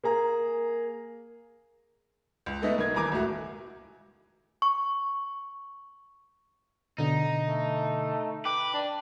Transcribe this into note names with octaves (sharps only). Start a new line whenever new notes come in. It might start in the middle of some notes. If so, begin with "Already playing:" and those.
A#3 G#4 A#5
C#2
G#3 A3 B3 D#4 A4
B1 A#3 D#4 G#6
D#1 E3 A#4 G#5 A#5 D6
C#2 A2 A3 F#4
C#6
B2 D3 D#4
A3
B4 G5 D6
D4